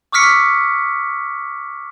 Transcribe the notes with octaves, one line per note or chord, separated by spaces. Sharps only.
C#6 D6 E6 F6 B6 C#7